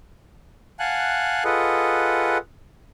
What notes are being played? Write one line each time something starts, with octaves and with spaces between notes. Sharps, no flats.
F5 F#5 G#5 A5 F#6
F4 G#4 A4 B4 D#5 F#5